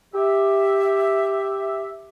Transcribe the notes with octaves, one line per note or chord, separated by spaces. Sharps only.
G4 E5